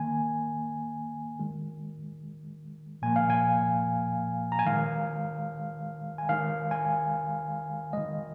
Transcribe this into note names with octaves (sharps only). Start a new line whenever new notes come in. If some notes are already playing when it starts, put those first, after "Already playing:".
Already playing: D#3 A#3 G#5
D#3 G#3
A#2 F3 A#3 G#5
F5
G#5
A#5
G#5
D#3 G#3 F5
G#5
D#3 G#3 F5
G#5
D#3 G#3 D#5